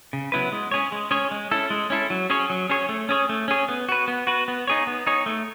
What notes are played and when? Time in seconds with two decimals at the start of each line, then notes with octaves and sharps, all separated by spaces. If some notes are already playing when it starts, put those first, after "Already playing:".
0.13 C#3
0.32 F#3 B3 E4 B4
0.52 G#3
0.71 C#4 G#4 C#5
0.92 G#3
1.11 C#4 G#4 C#5
1.31 G#3
1.51 C#4 E4 A4
1.70 G#3
1.90 C#4 E4 A4
2.10 F#3
2.30 C#4 G#4 C#5
2.50 F#3
2.70 C#4 G#4 C#5
2.89 A3
3.09 C#4 G#4 C#5
3.29 A3
3.48 C#4 G#4 C#5
3.68 B3
3.89 F#4 B4
4.08 B3
4.27 F#4 B4
4.48 B3
4.67 D#4 G#4 C#5
4.87 B3
5.07 D#4 G#4 C#5
5.26 A3